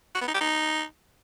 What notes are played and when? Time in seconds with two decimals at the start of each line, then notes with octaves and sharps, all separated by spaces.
0.15 F#4
0.21 B3
0.28 D#4
0.34 G4
0.41 D#4